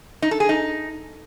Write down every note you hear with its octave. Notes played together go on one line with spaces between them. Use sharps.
D#4
A4
G#4
D#4